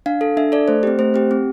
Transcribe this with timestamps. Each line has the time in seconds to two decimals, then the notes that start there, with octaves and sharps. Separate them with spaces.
0.06 D4 F5
0.21 A4
0.37 D4 E5
0.52 A4 D5
0.68 A3 C5
0.83 C4 G4
0.99 A3 C5
1.14 C4 G4
1.31 C4